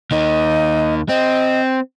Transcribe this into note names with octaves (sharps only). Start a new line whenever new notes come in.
D#2 D#3 D#5
C4 D#5